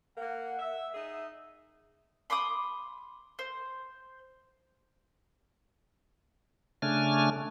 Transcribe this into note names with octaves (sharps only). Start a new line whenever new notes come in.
A#3 F#5
E5
D#4 G#4 E5
B5 C6 D6 D#6
C5
C#3 A3 D4 G#5 F6